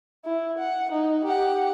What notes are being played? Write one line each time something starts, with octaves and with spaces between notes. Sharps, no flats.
E4
F#5
D#4
G4 F#5